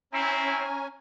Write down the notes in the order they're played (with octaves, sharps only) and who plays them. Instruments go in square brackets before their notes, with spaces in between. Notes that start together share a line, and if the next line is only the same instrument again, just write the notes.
[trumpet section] C4 E4 [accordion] C#4 G#5 [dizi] A#5